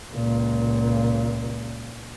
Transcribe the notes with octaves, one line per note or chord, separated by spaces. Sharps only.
C#2 A#2